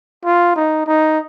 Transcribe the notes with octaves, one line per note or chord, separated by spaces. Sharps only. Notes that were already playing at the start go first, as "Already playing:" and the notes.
F4
D#4
D#4